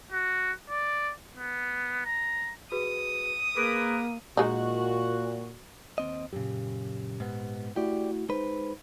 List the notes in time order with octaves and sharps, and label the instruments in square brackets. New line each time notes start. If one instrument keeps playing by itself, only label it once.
[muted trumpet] F#4
D5
B3
A#5
[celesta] F#4 G#4 B4 [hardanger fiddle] D#6
[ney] A#3 [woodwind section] G#4 A#4 B4 [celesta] D6 B6 D7
[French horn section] A#2 [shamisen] G#3 D#4 [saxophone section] F#4
[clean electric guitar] D#2 C4 D#5
[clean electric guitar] F#2 C#3 [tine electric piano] A#2 G4
[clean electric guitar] G#2 B3
[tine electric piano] A3 E4 F#4 [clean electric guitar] G4 D5
[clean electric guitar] G#3 B4 [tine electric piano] D#4 C5